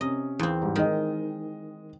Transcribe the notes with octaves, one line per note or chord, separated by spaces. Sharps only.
C3 C#4 D#5
E2 C4
G#2 G3
D#3 G#3 D#5